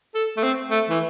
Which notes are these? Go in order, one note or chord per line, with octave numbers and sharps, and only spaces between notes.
A4
A3
C4
A3
E3